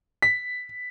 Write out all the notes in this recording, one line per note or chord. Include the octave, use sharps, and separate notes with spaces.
B6